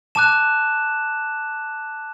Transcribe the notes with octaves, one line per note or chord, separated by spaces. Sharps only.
A5 D6 F#6 E7